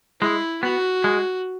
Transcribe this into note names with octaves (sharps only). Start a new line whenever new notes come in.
G#3 E4
B3 F#4
G#3